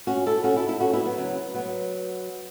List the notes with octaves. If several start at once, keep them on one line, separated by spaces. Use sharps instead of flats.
C#4 F#4
E4 A4
C#4 F#4
E4 A4
E4 A4
C#4 F#4
B3 E4
F#3 B3
C#3 F#3
F#3 B3